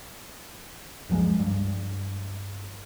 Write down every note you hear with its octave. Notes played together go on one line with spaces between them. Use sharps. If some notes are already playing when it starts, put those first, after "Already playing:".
F#1 C#2 F3 G#3
G2